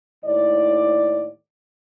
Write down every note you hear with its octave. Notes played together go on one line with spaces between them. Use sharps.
D#2 A2 D5